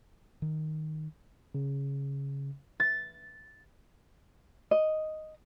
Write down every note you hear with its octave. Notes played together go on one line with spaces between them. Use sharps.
D#3
C#3
A6
D#5